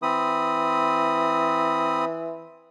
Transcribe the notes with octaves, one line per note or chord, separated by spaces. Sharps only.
E3 C4 B5 D#6